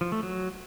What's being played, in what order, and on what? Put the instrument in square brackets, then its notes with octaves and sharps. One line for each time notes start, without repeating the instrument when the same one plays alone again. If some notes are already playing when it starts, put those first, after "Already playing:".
[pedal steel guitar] F3
A3
F#3